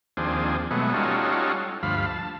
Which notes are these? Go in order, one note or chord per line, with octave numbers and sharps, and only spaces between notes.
D#2 F3 C4 D4 G#4
B2 F#3 G#3 A3 B3
G3 C#4 D#4 F4 F#4 A4
D2 G2 F3 F5 B5
A5